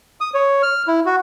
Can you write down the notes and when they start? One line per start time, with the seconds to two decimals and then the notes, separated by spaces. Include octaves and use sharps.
0.21 D#6
0.34 C#5
0.63 F6
0.88 E4
1.06 F#4